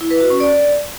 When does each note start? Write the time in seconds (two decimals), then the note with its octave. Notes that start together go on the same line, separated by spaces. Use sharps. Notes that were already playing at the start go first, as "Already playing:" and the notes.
0.01 E4
0.11 B4
0.21 F#4
0.30 C#4
0.40 D5